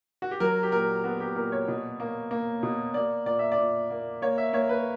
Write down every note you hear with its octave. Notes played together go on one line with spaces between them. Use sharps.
F#4
G4
F#3 A#4
G4
A#2 A#4
B3 F#4
G4
A#2 A#4
C#5
B2
A#3
A#3
B2
A#3 D5
A#2 D5
E5
D5
A#2
A#3
A#3 C#5
E5
A#3 C#5
B4